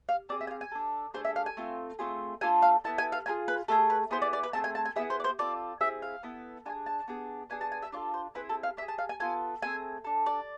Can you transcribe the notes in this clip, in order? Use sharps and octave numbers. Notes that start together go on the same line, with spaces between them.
F5
C4 G#4 D5
E5
G#5
F5
G#5
D4 A4
A3 D4 G#4 C5
E5
F5
G#5
A3 C4 F4
A3 C4 F4 G#4
A3 D4 F4 A4 G#5
F5
B3 E4 A4 A5
G#5
F5
A3 D4 F4 G#4 G#5
B4
A3 E4 G#4 A4
B4
B3 E4 G#4 C5
D5
D5
B4
A3 C4 G#4 A5
G#5
A5
G#5
B3 E4 G#4 E5
C5
D5
C5
C4 F4 A4 D5
C4 E4 G#4 E5
F5
B3 E4 A4
D4 F4 G#4 G#5
A5
B3 D4 G#4
B3 D4 G#4 G#5
A5
G#5
E5
D4 F4 A4 D5
C5
C4 E4 G#4 B4
A4
F5
D4 E5
G#4
A5
F5
G#5
B3 F4 A4 G#5
A3 C4 G#4 G#5
D4 A4
D5